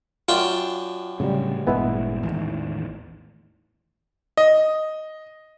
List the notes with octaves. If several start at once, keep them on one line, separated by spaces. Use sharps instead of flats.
F#2 D4 F4 G5
A2 C#3 F#3 G3
G#1 G2 A#2 G#3 B3 E4
A1 E2 D#3
D#5